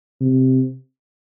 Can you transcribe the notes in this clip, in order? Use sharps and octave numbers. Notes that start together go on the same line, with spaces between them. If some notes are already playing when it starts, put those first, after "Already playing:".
C3